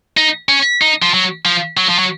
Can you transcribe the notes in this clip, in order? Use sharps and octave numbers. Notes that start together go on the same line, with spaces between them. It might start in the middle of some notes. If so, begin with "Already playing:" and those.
D#4
C#4
D#4
F3
F#3
F3
F#3
F3
F#3